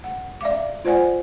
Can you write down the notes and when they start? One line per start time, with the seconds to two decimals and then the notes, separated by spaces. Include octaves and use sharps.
0.04 F#5
0.41 D5 E5 F5 D6
0.85 F4 C5 D5 F#5 G#5